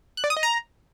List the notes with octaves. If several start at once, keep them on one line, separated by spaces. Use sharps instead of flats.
F#6
D5
D#6
D#5
A#5